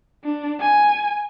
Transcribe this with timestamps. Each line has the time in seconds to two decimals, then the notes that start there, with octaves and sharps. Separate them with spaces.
0.24 D4
0.60 G#5